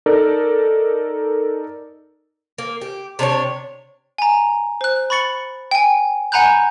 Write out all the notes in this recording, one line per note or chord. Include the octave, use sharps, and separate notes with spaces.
D#4 A4 A#4 D5
A#3
G4
C3 D4 B4 C#5
G#5 A#5
C5 F#6
B5 C#6 A6 C#7 F#7
G5 G#5
F#5 G#5 A#5 B5 F#6 G6